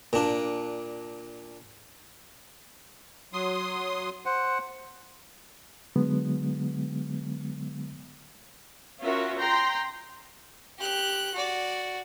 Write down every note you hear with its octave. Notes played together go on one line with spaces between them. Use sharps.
A#2 D4
F#3 C6 D#6
C5 F#5
D3 F#3 G#3 B3
C#4 F4 F#4 A#4 E5
G5 A#5 C6
G4 F#6
F#4 D5